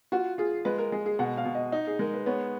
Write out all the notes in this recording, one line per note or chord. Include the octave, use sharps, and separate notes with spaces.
F4 F#4
F4 G#4
G#3 B4
A#4
G#3 G#4
G#4
B2 F#5
F5
B2
D#5
D#4
G#4
G#3 A#4
B4
B3 C#5